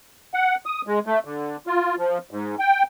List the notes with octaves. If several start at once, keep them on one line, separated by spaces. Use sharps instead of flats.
F#5
D#6
G#3
A3
D3
F4
F3
G#2
G5